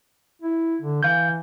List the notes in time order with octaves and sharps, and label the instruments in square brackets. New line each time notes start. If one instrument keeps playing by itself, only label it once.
[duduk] E4
D3
[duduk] E3 [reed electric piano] F5 G6